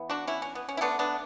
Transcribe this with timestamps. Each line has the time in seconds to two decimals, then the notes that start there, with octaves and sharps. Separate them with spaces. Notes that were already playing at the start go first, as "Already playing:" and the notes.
Already playing: E3 B3
0.10 D4 F#4
0.27 C#4 E4
0.42 C#4
0.55 B3
0.69 C#4
0.77 E4
0.81 D3 A3 B3 D4
0.99 B3 D4